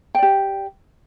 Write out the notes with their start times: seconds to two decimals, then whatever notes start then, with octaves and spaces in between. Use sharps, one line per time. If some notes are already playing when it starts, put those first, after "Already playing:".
0.15 G5
0.19 D5
0.22 G4